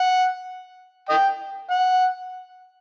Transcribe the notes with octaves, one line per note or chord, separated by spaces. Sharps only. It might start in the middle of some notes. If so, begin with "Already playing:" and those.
Already playing: F#5
D#5 G5
F#5